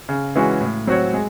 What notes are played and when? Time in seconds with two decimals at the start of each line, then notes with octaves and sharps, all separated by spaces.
0.09 C#3
0.35 E3 G#3 C#4 F#4
0.61 A2
0.87 F#3 C4 F#4 C#5
1.13 G#3